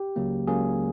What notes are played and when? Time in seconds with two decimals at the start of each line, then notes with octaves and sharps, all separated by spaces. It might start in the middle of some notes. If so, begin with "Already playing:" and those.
Already playing: G4
0.16 C#2 C#3 F#3 A#3
0.47 C#2 C#3 F#3 A#3 G#4